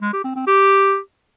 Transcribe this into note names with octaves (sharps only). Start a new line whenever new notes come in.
G#3
G4
C4
C4
G4